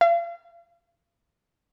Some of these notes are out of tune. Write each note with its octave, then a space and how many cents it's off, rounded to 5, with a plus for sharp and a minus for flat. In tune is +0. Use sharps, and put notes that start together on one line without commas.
F5 -35